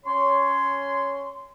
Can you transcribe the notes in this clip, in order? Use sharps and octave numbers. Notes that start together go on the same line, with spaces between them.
C#4 C#5 C6